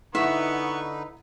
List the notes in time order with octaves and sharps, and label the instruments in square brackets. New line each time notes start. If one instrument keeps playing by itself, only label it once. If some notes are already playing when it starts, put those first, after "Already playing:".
[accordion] D3 D#4 B4 [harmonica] B3 C#6 [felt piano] E4 F#5 [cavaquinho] E5